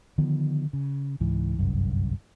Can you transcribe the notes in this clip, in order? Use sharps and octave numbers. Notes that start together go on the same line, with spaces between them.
D3 D#3 F3 B3
C#3
C#2 G#2 E3
G1 C2 F#2